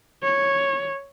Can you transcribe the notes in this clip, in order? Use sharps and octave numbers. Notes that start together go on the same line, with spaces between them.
C#5